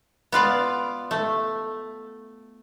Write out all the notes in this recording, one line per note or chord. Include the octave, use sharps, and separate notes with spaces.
B3 F4 D5
A3